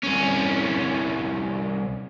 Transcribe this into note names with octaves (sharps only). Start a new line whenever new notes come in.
C2 C#4